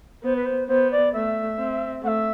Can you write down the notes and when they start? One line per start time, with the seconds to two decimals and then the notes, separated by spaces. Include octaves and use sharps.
0.23 B3 C5
0.35 B4
0.45 C5
0.68 B3 C5
0.91 D5
1.13 A3 E5
1.58 C4
2.03 A3 F#5
2.07 E5